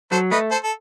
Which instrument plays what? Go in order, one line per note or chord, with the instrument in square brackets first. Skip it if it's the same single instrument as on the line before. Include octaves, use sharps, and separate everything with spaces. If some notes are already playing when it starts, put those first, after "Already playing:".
[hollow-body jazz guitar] F#3 [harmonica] A4 C5
[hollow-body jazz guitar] A3 [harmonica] B4 D#5
[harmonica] A4 C5
A4